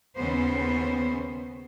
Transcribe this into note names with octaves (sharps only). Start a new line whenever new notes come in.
D#2 C#3 B3 C#4 C5